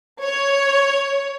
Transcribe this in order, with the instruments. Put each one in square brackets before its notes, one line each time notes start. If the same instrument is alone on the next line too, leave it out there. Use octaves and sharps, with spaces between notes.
[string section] C#5